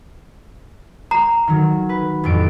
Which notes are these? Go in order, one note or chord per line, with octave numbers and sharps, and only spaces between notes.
A#5
D#3 F#3
B4
A1 F2 D7